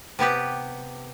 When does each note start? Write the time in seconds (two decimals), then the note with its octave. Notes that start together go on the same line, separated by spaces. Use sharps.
0.19 C3 B3 G4 B4